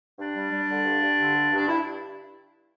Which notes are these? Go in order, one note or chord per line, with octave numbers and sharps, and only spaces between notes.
G2 D4
G3
G3
D3
G2
G2
D3
G2
G2
D4
G2 E4